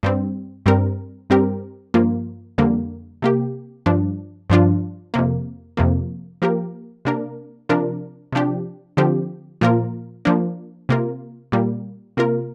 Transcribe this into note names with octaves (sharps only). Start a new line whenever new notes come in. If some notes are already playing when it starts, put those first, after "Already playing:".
G2 G3 C4
G2 G3 C4 A#4
G2 G3 C4 G4 A#4
G2 F3 A#3 F4
F2 D3 G3 A#3
C3 A#3 G4
G2 F3 D4
G2 F3 D4 F4
F2 C3 A#3
F2 C3 F3 A#3
F3 A#3 G4 A#4
C3 A#3 D4 A#4
C3 F3 D4 F4 A#4
C3 F3 D4 G4
D3 F3 C4 G4
A#2 F3 A#3 F4 A#4
F3 A#3 D4
C3 A#3 F4 A#4
A#2 G3 A#3
C3 A#3 F4 A#4